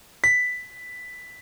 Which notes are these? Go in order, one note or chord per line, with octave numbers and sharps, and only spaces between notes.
B6